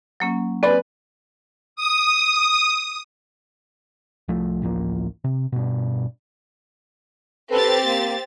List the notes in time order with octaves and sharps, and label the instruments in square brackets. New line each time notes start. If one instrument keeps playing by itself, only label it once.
[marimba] F#3 A#3 C#4
[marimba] C4 G#5 B5 [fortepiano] B4 D5
[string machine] D#6
[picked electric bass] C2 F3 A3
A1 D2 F3 A#3
C3
G2 B2
[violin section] C4 G4 A6 [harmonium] A4 B4
[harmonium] A#3